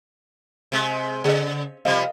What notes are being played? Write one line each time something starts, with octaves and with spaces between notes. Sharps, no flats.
C3 G#3
C#3 G#4 D#5
C3 F3 G3 A#4 D#5 F5